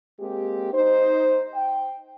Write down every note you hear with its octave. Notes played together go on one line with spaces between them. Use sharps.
G#3 A#3 C4 G4
D#4 C5
G5